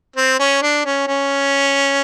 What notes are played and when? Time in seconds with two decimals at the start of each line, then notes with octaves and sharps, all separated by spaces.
0.16 C4
0.39 C#4
0.62 D4
0.85 C#4
1.07 C#4